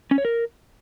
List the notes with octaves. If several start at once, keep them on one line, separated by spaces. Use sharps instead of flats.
C#4
C#5
A#4